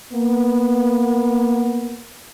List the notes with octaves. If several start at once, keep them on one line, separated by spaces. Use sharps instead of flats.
A#3 B3